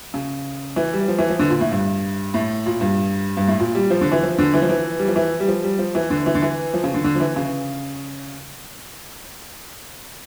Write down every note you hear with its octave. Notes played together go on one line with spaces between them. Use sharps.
C#3
E3
G3
F3
E3
F3
D3
A#2
A2
G2
A2
A#2
G2
G2
A2
A#2
G3
F3
D3
E3
F3
D3
E3
F3
E3
G3
F3
E3
G3
F3
G3
F3
E3
D3
E3
D3
E3
F3
C#3
D3
D3
F3
E3
C#3